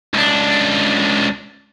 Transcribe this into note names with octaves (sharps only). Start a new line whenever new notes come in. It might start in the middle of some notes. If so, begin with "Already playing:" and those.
C#2 D4